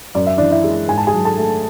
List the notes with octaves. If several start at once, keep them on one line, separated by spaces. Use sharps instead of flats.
F#2 D5
E5
E3 D4 D5
E4 E5
G#3
G#2 G#5
A5
G#4 G#5
F#3
A4 A5
A3